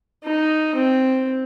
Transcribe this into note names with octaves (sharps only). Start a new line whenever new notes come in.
D#4
C4